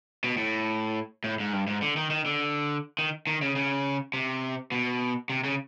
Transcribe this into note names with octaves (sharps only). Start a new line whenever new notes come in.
B2
A2
A2
G#2
G2
G#2
D3
D#3
D#3
D3
D#3
D#3
C#3
C#3
C3
B2
C3
C#3